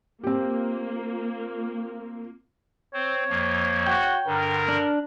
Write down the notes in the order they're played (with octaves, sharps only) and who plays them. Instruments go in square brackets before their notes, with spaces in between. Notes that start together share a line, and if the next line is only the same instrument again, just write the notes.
[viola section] A#3 F4 [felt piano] C4 G4
[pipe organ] C4 C5 [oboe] C#5
[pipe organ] F2 F3 A#3
[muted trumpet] F#4 [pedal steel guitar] G5
[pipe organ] G2 D3 [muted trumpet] A#4
[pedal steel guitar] D4